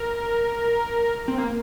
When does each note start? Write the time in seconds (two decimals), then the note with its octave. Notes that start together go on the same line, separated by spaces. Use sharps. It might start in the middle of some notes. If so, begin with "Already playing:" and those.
Already playing: A#4
1.28 C4
1.38 A#3